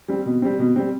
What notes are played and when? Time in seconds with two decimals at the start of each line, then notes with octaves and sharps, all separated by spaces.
0.08 G3 C4
0.26 B2
0.42 G3 C4
0.59 B2
0.76 G3 C4